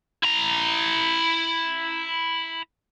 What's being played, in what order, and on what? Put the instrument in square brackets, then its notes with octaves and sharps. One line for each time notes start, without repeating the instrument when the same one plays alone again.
[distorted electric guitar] E4 A#5